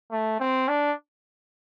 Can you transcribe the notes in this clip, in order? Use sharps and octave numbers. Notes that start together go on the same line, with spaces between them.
A3
C4
D4